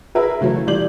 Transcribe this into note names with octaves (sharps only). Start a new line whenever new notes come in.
G#4 A#4 B4 E5
C#3 E3 F#3 A3
A#2 E3 G3 D5 G6 F#7